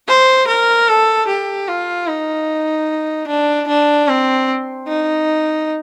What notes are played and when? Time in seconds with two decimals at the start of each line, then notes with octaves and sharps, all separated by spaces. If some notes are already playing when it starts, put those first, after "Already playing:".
0.08 C5
0.48 A#4
0.88 A4
1.28 G4
1.68 F4
2.08 D#4
3.28 D4
3.68 D4
4.08 C4
4.88 D#4